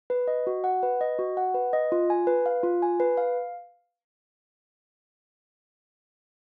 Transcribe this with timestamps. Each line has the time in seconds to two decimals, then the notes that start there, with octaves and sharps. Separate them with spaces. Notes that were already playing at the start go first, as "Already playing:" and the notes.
0.10 B4
0.28 D#5
0.47 F#4
0.64 F#5
0.83 B4
1.01 D#5
1.19 F#4
1.37 F#5
1.54 B4
1.73 D#5
1.92 F4
2.10 G#5
2.27 B4
2.46 F5
2.63 F4
2.82 G#5
3.00 B4
3.17 F5